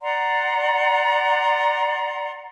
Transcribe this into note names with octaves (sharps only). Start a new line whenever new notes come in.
D5 F#5 A#5 C6